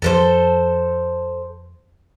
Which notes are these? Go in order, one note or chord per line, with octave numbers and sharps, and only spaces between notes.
F2 F3 A4 A#4 C5